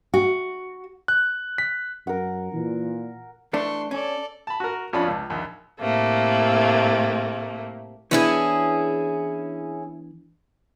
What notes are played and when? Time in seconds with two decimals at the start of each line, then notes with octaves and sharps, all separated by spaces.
0.14 F#4
1.08 F#6
1.58 B6
2.07 F#2 A#4 F#5
2.53 A#2 E3
3.53 E3 A3 D4 C6 C#6
3.91 C#4 A4 D5
4.47 A5 B5
4.60 F#4 A#4
4.93 F2 F3 C#4 D4 F4 B5
5.08 C#2
5.30 A#1 D#2
5.80 A2 C3 A3 A#3
8.11 E3 B3 C#4 D4 E4 G#4